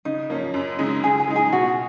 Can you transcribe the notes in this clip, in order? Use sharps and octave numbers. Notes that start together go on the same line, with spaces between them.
C#3 D#4
F3 A#3 C#4
F#2
C#3 G#3 D#4 G#4
C#3 G#4
G#4
G#3 D#4
G#4
B2 F#4